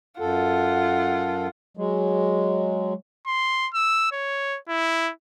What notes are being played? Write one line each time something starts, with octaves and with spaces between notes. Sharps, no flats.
F#2 F4 A4 F#5
F#3 G#3
C6
E6
C#5
E4